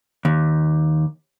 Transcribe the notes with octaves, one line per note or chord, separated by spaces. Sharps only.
D#2